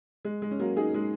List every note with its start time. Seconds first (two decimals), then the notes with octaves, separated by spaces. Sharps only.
0.25 G#3
0.42 G#3
0.51 C#4
0.59 F#3 A#3
0.76 D#4 G#4
0.94 G#3